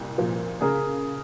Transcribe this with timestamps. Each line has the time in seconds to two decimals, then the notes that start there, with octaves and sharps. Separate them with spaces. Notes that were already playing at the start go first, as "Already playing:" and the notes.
Already playing: C2 A#2
0.18 A#2 F3
0.61 C#3 G#4 A#4